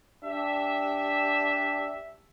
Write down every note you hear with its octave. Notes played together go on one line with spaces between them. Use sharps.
D4 G4 E5